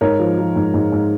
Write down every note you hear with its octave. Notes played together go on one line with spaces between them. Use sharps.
G#2 A#4 C#5
F3
F3
G#2
G#2
G#2